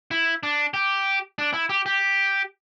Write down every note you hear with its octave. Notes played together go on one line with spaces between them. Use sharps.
E4
D4
G4
D4
E4
G4
G4